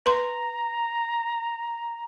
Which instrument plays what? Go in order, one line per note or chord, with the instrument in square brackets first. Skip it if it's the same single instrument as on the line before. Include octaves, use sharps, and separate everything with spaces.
[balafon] B4 C6 [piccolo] A#5